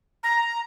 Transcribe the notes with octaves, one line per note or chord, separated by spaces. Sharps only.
A#5